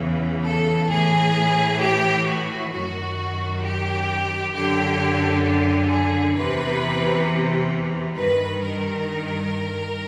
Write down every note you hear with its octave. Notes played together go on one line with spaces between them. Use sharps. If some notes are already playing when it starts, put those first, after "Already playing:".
Already playing: E2 C#3 E3
A4
A2 E3 G#4
G4
F#4
F#2 D#3 F#4
G4
F#2 D3 G4
G4
G#4
E2 C3 E3 B4
G2 D#3 B4
A#4